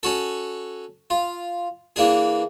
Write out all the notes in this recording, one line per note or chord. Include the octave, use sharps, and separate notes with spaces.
C#4 F#4 A4
F4
E3 A#3 D4 G#4